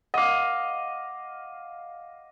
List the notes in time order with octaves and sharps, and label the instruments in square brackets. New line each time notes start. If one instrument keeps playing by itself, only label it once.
[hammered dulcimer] D#5 F5 [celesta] F#5 D6